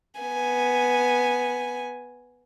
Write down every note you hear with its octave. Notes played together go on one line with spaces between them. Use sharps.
B3 G#5